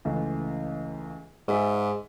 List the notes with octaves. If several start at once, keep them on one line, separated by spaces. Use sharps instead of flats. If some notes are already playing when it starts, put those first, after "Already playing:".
C#2 E3 A3
G#2 F#4 G#4 E5